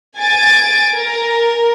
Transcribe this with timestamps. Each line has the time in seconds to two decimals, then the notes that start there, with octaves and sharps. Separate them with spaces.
0.18 G#5 A6 D7
0.98 A#4